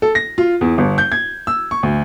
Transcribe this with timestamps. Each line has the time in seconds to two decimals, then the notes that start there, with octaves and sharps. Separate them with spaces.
0.02 A4
0.15 A#6
0.38 F4
0.61 E2
0.78 G1
0.98 G6
1.12 G#6
1.47 E6
1.71 C#6
1.83 D2